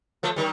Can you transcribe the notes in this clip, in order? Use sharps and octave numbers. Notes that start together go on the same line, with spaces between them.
F3 A3
D#3 G3